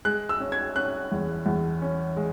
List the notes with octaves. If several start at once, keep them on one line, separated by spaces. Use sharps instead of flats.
G#3 F#6
E6
C#4
G#6
C#4 F#6
E2
E2
C#4
G#3